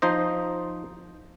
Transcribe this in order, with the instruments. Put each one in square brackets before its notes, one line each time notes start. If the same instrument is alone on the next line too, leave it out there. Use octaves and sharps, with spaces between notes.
[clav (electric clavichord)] F3 D#4 C5 D#5